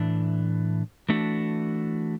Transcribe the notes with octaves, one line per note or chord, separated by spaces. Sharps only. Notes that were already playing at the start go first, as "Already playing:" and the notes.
Already playing: A2 E3 D4
E3 A3 D4 F#4